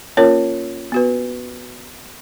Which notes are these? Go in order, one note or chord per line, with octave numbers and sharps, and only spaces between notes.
A#3 C#4 F4 A#4 C#5
B3 F#4 B4